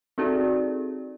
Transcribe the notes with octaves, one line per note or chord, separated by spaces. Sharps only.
C4 D#4 F#4 G#4 A4 D5